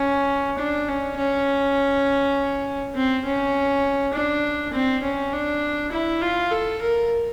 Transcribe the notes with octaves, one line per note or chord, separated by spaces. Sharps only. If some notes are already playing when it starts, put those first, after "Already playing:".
Already playing: C#4
D4
C#4
C#4
C4
C#4
D4
C4
C#4
D4
E4
F4
A4
A#4